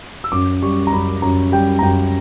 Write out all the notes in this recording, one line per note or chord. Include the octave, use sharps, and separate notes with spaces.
E6
F#2 D6
G3 C#6
A#5
F#2 B5
F#2 A#5
G3 G5
A#5
F#2 G5